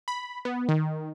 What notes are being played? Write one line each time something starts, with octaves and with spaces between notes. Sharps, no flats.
B5
B3
D#3